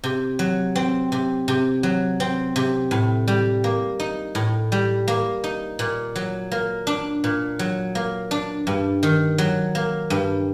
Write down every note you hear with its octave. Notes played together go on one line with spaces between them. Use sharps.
C3
F#3
C4
C3
C3
F#3
C4
C3
A2
G3
A#3
D#4
A2
G3
A#3
D#4
A#2
F#3
A#3
D4
A#2
F#3
A#3
D4
G2
D#3
F#3
A#3
G2